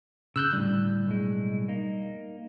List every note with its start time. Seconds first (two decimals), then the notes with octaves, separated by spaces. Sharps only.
0.36 C#3 E6 F#6 G6
0.53 A2 D3 G3
1.06 B1 A2 G#3
1.68 A#3 D#4